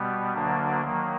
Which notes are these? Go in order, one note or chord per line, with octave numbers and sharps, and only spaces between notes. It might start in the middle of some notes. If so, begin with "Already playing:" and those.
Already playing: B2 G3 B3
D2 D3 F#3 A#3 D4
D#3 F#3 A#3